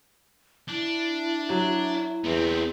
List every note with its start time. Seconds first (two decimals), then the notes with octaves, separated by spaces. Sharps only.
0.68 D4 E4
1.49 F#3
2.24 E2 B3 C4